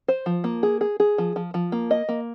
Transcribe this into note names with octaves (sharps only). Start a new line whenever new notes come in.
C5
F3
A#3
G#4
G#4
G#4
F3
F3
F3
A#3
D#5
A#3